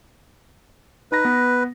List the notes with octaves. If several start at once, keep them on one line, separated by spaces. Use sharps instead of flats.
D#4 B4 A#5 A#6
B3